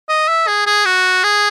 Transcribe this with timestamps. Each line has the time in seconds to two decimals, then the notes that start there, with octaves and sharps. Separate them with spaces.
0.09 D#5
0.28 E5
0.47 G#4
0.66 G#4
0.85 F#4
1.24 G#4